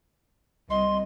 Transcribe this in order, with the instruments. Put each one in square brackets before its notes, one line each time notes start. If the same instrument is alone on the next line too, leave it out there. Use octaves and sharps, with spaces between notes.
[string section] C2 [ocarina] D#5 [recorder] C6